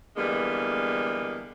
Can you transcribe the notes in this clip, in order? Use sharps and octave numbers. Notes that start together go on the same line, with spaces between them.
D3 E3 G3 G#3 A#3 B3